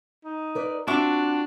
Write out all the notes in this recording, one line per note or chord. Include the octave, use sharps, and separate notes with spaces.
D#4
A#4 B4 D5
C4 D4 F4 F#4 E5 C#6 D6